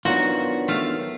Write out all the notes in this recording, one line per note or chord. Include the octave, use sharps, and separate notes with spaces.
D#3 F#3 B3 D4 F4 F#4
A3 F5